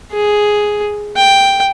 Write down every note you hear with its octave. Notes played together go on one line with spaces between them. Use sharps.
G#4
G5